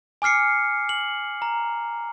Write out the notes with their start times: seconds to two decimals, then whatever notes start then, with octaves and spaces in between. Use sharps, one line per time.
0.22 G#5 D6 F6 C7 C#7
0.89 F#7
1.42 A#5